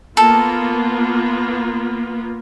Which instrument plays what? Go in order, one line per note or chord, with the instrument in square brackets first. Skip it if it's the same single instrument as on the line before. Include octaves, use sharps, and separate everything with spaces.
[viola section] A#3 B3 F4 [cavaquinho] A4